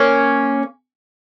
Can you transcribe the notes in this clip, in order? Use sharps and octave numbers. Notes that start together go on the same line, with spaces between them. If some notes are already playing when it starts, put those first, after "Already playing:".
Already playing: A#3 C#4